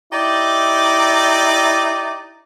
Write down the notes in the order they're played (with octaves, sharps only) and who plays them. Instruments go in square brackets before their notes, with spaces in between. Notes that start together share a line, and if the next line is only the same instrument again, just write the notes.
[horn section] D#4 E4 G4 D5